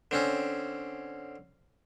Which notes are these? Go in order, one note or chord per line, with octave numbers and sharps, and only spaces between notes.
D3 C4 C#4